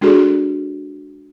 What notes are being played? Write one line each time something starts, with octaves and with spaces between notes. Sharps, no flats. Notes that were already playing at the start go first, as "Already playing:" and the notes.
G#3 D4 F#4 G#4 A4 D5